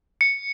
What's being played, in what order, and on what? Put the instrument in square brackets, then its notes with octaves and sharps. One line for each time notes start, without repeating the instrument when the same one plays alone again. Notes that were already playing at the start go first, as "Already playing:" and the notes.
[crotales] C#7